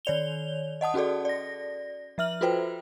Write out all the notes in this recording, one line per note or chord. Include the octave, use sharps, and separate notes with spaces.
D#3 C#5 D5 F7 G7
D#5 F#5 A5 D#6
C#4 F#4 G#4 A4 D5
D5 A#6
F3 E5 F6 F#7
F4 F#4 A4 B4 C5 G5